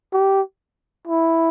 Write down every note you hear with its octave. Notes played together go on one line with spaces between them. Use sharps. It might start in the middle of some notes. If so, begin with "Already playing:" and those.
G4
E4